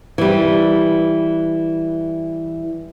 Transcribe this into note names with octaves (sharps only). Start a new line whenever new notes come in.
E3 G3